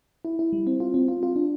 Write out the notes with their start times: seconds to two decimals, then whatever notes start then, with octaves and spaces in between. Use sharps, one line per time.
0.25 E4
0.39 E4
0.53 G3
0.67 C4
0.80 F4
0.94 C4
1.08 F4
1.23 F4
1.36 D4